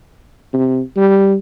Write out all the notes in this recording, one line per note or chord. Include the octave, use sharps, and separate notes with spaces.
C3
G3